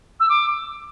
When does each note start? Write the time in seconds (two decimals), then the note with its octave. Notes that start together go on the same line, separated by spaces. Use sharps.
0.20 E6
0.29 D6